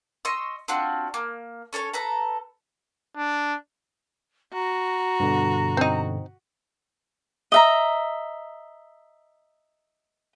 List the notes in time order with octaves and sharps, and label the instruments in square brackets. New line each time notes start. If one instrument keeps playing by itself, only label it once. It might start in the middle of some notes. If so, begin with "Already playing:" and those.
[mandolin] D#5 C6 C#6 E6
C4 D4 F4 F#4
A#3
C#4 A4 C5 C#5
A4 B4 A#5
[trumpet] D4
[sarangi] F#4 [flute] A#5
[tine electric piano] G2 B2 D3
[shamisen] C4 D#4
[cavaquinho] D#5 E5 A#5